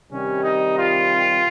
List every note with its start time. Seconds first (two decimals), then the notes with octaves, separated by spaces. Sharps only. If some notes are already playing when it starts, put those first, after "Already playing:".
0.11 C3 D#3 G3 C#4
0.44 D#4
0.77 F4